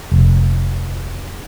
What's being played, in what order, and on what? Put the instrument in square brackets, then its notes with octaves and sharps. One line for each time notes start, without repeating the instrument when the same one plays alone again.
[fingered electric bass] F1